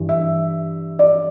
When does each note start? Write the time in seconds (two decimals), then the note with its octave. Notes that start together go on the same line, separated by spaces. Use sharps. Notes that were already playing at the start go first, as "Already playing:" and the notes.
Already playing: G2 E3 G3
0.09 E5
0.99 D5